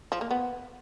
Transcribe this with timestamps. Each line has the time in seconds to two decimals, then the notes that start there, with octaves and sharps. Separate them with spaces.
0.12 F3
0.21 A#3
0.31 B3